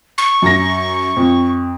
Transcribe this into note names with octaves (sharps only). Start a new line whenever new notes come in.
C#6
F#2 A#6
F2